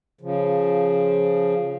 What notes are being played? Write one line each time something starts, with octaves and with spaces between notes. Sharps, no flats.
C#3 F3